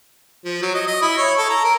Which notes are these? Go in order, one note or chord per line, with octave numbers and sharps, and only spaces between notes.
F3
F#3
D#5
D#5
E4
C#5
A4
A#5
A#4